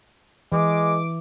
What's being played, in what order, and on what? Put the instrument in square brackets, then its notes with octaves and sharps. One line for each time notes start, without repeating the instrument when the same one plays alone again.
[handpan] E3 [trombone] G#3 [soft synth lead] D6